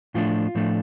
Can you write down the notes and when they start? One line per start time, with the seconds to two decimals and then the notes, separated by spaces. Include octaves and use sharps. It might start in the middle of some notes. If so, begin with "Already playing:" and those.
0.14 A2 F3 A3 D4 F4
0.55 A2 F3 A3 D4